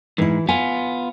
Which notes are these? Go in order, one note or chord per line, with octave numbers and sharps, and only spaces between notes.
G#2 E3 E4
B3 F4 G#5